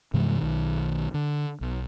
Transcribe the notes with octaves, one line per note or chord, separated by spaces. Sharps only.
G2 C3 E3 G#3
B1 D#3
D3
B1